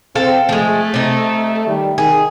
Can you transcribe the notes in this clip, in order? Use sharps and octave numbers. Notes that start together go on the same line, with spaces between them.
C4 A4 F5
F3 G#3 A3
C3 D#4
D#3 G3
D#3 G#4